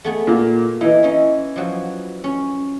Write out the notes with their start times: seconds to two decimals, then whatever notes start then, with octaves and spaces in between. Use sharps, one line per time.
0.04 A3 B3 G#4
0.27 A#2 A#3
0.81 E3 D#4 E4
1.03 C#4 D#4
1.56 F3 F#3
2.24 C#4